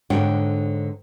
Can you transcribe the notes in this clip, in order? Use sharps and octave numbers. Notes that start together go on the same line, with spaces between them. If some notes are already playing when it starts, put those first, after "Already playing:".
G#2 D3 D4 C#5 G5